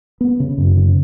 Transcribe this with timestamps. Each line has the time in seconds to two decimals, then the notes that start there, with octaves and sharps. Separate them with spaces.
0.21 B3
0.40 C#3
0.58 F#2
0.76 C#3